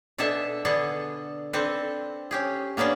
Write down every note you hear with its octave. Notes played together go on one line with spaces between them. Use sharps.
B2 D4 G#4 A4 E5 A5
D3 B3 D4 G#4 A4
C4 D4 A4 B4
C#4 G4 G#4
A#3 B3 C#4 D4 G#4